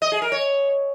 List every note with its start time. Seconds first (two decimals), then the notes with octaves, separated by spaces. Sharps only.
0.02 D#5
0.12 G#4
0.22 A#4
0.32 C#5